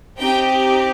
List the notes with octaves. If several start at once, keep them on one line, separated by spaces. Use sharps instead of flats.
C4 D#4 G4 G5